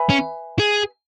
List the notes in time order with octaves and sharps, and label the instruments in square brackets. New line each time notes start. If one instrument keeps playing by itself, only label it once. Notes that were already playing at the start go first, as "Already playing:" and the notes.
Already playing: [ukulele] B4 E5 G#5 B5
[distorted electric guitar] C#4
G#4